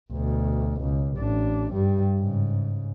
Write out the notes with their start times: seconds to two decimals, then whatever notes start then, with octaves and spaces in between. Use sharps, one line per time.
0.12 D2 B2
0.81 C#2
1.18 A1 D4
1.72 G2 G3
2.18 G#2 C#3